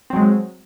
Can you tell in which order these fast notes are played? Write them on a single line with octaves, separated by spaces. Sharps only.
C4 F#3 G#3